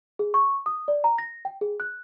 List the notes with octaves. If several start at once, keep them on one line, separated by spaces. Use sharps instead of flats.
G#4
C#6
D#6
D5
A#5
A#6
G5
G#4
F#6